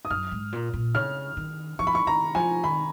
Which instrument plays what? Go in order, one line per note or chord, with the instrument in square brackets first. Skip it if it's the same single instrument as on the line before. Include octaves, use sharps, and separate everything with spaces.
[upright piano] D#6
[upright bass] F#2 [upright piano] F6
[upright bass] G#2
A#2
A#2
[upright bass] C#3 [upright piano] F6
[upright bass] D#3
[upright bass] F3 [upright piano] C#6
[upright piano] B5
C#6
[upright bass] D#3 [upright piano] A#5
[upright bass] F3 [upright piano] G#5
[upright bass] D#3 [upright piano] B5